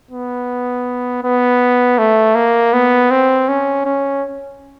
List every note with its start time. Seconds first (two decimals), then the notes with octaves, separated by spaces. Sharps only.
0.11 B3
1.23 B3
1.98 A3
2.35 A#3
2.73 B3
3.11 C4
3.48 C#4
3.85 C#4